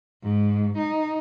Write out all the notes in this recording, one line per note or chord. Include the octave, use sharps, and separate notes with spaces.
G#2
D#4